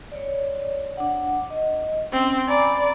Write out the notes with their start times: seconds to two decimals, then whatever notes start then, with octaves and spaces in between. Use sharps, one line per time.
0.12 C#5 D5
0.97 D4 F#5
1.50 D#5
2.12 C4 C#4
2.48 D5 G#5 A#5 B5